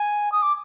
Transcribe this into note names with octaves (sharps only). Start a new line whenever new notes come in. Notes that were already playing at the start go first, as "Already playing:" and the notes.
Already playing: G#5
D#6
D6